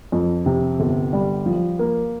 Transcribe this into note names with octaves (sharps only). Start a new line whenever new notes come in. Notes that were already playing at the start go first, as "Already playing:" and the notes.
F2
C3
G1
G3
F3
A#3